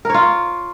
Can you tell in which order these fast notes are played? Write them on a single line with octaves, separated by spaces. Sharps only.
A#4 C#5 F4